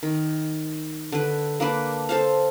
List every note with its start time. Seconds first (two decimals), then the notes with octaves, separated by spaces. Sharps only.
0.03 D#3
1.12 D3 B4
1.60 A#3 D4 B4
2.09 A4 C5 F5